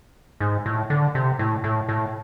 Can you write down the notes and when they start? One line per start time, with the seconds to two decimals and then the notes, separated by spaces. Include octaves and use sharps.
0.40 G#2
0.66 A2
0.90 D3
1.15 C3
1.39 A2
1.64 A2
1.89 A2